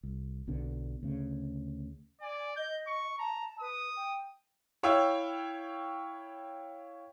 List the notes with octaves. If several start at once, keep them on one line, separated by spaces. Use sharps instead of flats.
C2
B1 B2 D3
D2 C#3
D5 G#5
D#5 G6
C#6
A5 A#5
B4 D#6
G5
E4 C#5 F5 G5 E6